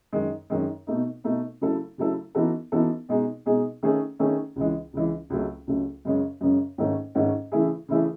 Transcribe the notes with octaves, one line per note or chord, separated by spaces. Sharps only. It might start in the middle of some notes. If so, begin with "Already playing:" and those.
F#2 D#3 G#3
F#2 D#3 G#3
B2 A3 D#4
B2 A3 D#4
C#3 F#3 A3 E4 A4
C#3 F#3 A3 E4 A4
E3 B3 D#4 F#4 A4
E3 B3 D#4 F#4 A4
B2 G#3 D#4 G#4
B2 G#3 D#4 G#4
D#3 A3 C#4 G#4
D#3 A3 C#4 G#4
C#2 C#3 E3 G#3
C#2 C#3 E3 G#3
C#2 C#3 F#3 A3
C#2 C#3 F#3 A3
F#2 C#3 G#3 C#4
F#2 C#3 G#3 C#4
G#2 D#3 A3 C#4
G#2 D#3 A3 C#4
C#3 E3 A3 E4 G#4
C#3 E3 A3 E4 G#4